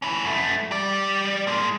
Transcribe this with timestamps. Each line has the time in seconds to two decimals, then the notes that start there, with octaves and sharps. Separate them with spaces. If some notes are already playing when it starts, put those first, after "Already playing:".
0.02 C#4 E4
0.25 F#2 A3
0.71 G3 D5
1.47 G#3 A#3